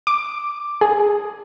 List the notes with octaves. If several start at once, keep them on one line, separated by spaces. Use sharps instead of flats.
D6
G#4